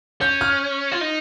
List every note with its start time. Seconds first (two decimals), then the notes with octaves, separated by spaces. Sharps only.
0.21 C#4 G6
0.41 F6
0.92 F4
1.01 D#4